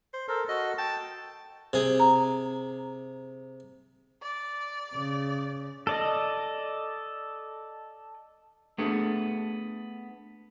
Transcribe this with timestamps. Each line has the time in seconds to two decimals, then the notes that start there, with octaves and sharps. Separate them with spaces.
0.13 C5
0.28 A4 A#4 C5
0.49 F#4 A4 D#5
0.78 G5 A5
1.73 C3 G#4
2.00 A#5
4.23 D5
4.94 C#3
5.87 A4 D5 D#5
8.78 A3 B3 D4 G#4 A4